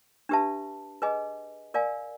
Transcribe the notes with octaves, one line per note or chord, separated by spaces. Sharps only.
D4 G4 B4 E5 A5
G#4 B4 D#5 G#5
A#4 D5 F5 G#5